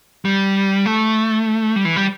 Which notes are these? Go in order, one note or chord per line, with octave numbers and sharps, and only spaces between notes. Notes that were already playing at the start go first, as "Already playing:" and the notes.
G3
A3
G3
E3
G3